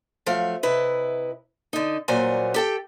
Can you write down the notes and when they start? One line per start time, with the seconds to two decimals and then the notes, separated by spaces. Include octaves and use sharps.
0.26 F3 F#3 A3 F5
0.63 C3 E4 B4 D#5
1.73 D3 D#4
2.08 A#2 F#3 G3 C5 C#5 G#5
2.54 G4 A4 G5